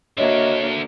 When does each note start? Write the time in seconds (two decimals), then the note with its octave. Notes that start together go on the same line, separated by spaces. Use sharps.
0.18 D3 A#3 D4 F#4 C#5 D#5 E5